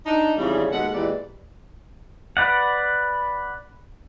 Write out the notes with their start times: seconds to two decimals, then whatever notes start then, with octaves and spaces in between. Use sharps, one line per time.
0.06 D4 D#4
0.37 F2 G#2 C#3 E3 G3
0.71 D#2 B2 G#3 A4 F#5
0.94 E2 A#2 E3 G#3 G4 D5
2.37 B4 D5 F#5